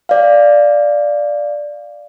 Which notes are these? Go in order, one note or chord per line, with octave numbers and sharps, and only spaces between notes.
D5 F5